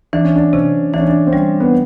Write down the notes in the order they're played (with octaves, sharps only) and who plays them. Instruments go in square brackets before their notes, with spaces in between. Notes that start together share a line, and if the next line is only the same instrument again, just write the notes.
[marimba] E3 [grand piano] D4
[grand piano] C#4
D4
[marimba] C3 [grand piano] C#4
[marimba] E3 [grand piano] D4
[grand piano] C#4
D4
C4
[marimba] G3 [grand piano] C#4
[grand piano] B3